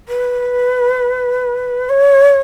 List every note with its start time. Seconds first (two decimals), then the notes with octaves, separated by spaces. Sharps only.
0.08 B4
1.89 C#5